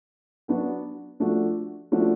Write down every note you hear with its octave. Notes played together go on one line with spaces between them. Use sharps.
F#3 B3 D4 F#4
F3 A3 D4 F#4
F3 A3 D4 F#4